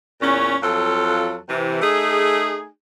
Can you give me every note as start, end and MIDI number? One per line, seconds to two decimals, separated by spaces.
0.22 0.56 40
0.22 0.56 46
0.22 0.56 61
0.63 1.39 41
0.63 1.39 54
0.63 1.39 65
0.63 1.39 69
1.48 1.79 48
1.48 1.79 52
1.81 2.68 57
1.81 2.68 63
1.81 2.68 68